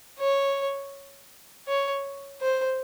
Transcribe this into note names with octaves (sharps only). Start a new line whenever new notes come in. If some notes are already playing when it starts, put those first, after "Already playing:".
C#5
C#5
C5